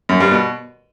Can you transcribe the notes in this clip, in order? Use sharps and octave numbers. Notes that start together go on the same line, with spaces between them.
F#2
G2
B2